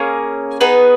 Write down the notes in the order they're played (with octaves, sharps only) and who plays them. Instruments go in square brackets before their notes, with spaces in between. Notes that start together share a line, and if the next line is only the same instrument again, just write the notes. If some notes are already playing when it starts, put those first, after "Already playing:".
Already playing: [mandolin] A#3 C#4 G#4
B3 D#4 G#4 B4